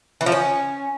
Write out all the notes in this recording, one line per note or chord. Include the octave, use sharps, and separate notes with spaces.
E3
F3
C#4